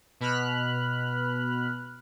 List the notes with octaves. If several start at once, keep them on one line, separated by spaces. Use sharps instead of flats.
B2 B5 F6 F#6